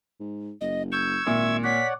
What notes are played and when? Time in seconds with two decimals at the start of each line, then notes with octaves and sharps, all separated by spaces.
0.20 G#2
0.61 F#1 D#5
0.92 C#6 E6 G6 G#6
1.26 G#1 A#2 E5
1.64 C#5 D5 F#5 B6